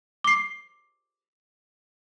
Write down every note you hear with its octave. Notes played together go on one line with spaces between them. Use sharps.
D6 C7